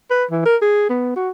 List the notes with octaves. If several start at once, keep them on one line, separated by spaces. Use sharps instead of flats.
B4
E3
A#4
G#4
B3
F#4